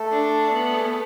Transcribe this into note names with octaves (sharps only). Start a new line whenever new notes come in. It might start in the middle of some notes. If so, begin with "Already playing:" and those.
Already playing: A3 A4
D4
B3
G#4
A4